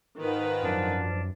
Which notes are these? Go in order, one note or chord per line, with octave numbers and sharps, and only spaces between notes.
G#2 D#3 F4 B4
F#2 F3 D4